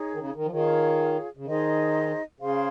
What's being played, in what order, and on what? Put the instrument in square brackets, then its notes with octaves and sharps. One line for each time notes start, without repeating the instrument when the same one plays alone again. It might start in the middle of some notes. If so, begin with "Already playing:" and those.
Already playing: [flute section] D#4 G#4 C#5
[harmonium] D#3
C#3
D#3
F3
[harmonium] D#3 [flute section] F4 G#4 C#5 F5
[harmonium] C#3
[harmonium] D#3 [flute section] D#4 G#4 C5 D#5
[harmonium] C#3 [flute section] G#4 C5 F5 C6